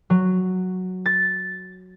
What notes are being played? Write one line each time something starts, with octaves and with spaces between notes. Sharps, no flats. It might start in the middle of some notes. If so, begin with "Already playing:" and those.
F#3
A6